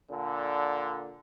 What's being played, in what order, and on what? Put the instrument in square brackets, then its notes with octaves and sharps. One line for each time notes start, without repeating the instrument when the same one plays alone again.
[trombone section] A#2 D3